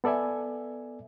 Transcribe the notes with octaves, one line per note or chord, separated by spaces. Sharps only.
B3 A4 D5 E5 G#5